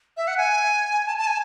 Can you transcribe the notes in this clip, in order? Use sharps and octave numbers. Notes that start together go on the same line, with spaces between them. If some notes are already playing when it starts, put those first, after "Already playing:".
E5
F#5
G#5
A5
A5
G#5